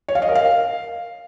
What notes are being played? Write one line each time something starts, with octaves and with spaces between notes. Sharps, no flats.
C#5
F5
D#5
A#4
F5